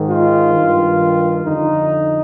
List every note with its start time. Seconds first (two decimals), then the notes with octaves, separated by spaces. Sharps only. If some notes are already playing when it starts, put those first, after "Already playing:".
Already playing: G#2 D#3
0.08 F4
0.54 G2 D#3
1.44 F2 D3 D#4